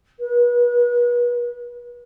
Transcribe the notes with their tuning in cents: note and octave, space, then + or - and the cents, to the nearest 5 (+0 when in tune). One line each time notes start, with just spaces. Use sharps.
B4 -35